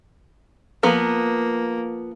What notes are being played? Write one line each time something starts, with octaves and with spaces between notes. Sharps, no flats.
F3 A#3 B3 A#5